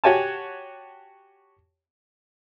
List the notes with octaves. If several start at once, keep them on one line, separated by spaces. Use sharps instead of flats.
F#4 G4 C#5 G#5 A5